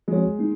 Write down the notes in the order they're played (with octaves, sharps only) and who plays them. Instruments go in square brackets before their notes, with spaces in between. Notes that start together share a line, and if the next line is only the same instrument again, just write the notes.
[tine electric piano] F3 C4 F#4 C#5 [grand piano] G#3
[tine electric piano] A#3 D#4